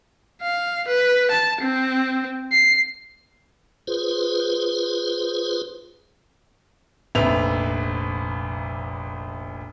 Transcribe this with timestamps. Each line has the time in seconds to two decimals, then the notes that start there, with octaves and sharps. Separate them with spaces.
0.42 F5
0.88 B4
1.31 A5
1.61 C4
2.52 C7
3.87 F4 G#4 B4 C5
7.15 F1 A#1 B4 E5 E6 F7